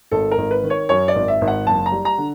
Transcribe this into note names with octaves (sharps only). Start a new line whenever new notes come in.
G#1 A4
A#4
G#1
B4
D#3
C#5
F#2 C#5
D5
G#1
E5
G#1
F#5
F#1 A5
A#5
G3
A#5
D3